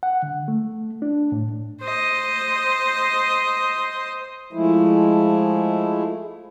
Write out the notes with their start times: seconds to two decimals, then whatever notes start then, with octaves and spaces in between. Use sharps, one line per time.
0.03 F#5
0.23 D3
0.48 A3
1.02 D4
1.32 A2
1.82 C5 D#5
4.53 F3 G#3 A3 E4